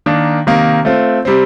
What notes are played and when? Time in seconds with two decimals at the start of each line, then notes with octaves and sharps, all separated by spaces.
0.06 D#3 A#3 D4
0.47 C3 D#3 A#3
0.85 A3 C4 F4
1.25 C3 G3 C4